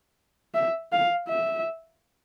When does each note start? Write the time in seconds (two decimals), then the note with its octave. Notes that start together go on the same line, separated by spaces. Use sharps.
0.54 E5
0.92 F5
1.29 E5